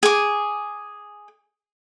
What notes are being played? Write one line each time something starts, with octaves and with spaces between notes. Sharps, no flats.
G#4 D6